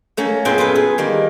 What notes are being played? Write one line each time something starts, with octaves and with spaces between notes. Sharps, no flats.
A3 A#3 C#4
F#2 A#2 B3 G#4 G5 C6
B3 F4 G#4 A4 B4
G#4
D#3 G3 A#3